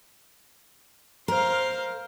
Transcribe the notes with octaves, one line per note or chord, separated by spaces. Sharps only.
A#4 C5 F5